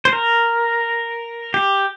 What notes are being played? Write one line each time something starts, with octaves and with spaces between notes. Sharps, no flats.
C5
A#4
G4